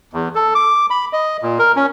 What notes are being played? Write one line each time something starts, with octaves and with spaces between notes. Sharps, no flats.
E2
A4
D6
B5
D#5
A#2
A#4
C#4